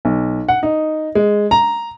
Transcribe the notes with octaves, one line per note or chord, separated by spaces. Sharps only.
B1
F#5
D#4
G#3
A#5